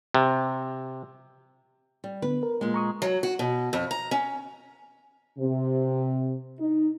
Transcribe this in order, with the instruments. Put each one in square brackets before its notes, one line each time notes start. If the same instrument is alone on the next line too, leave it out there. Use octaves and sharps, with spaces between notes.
[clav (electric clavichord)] C3
[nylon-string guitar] G3
[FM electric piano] D3 B3 [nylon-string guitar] B4
[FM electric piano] A#4
[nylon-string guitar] A#2 G#3
[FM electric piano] A#5 C#6 D#6
[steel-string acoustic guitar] F#3
F#4
B2
F2
A#5
C#4
[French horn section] C3
D#4